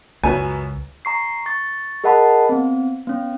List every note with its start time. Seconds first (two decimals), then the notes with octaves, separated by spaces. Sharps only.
0.24 C#2 F#2 F#3 B4 G#5
1.05 A#5 C#6 C7
1.46 C#6 A6
2.04 G#4 A#4 D#5 F#5 A5 B5
2.49 B3 C4
3.07 B3 C#4